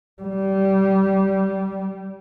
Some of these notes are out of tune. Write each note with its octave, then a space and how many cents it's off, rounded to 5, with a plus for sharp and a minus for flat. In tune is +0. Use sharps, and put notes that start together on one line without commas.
G3 -20